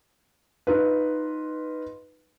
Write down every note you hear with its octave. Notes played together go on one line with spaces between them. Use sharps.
D#4 F4 B4